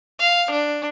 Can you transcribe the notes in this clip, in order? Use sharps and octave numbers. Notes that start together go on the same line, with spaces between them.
F5
D4